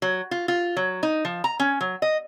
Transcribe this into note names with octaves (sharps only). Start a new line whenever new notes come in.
F#3
F4
F4
F#3
D#4
F3
A#5
C#4
F#3
D#5